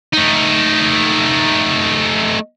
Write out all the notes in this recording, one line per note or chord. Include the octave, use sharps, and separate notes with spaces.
A3 D#4